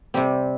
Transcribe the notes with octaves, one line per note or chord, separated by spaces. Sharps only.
C3 G3 C4